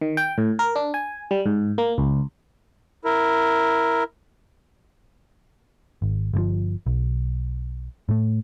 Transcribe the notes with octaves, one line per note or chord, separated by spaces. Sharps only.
D#3
G5
A2
A#4
D4
G#5
G3
G#2
A#3
C#2
E4 A#4
G#1
G1 C3 F3
B1
A2 A3